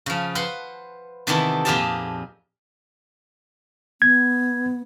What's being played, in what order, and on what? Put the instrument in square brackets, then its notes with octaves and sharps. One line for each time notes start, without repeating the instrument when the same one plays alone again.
[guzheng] C#3 F3
B4 C5 F#5 C6
C3 D#3 E3 B3 E4 A4
F2 A#2 F4 G4 G#4 A5
[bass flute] B3 [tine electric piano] G#6